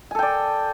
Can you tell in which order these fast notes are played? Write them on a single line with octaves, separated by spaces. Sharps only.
G#5 A4 G5 D5